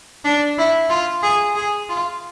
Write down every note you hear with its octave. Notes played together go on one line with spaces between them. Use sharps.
D4
E4
F4
G#4
G#4
F4